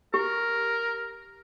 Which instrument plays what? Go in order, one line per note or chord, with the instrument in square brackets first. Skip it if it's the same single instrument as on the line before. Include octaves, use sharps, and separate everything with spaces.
[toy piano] G4 [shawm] A#4